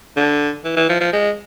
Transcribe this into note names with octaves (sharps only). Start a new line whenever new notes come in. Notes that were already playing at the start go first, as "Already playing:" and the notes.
D3
E3
E3
F3
F3
G#3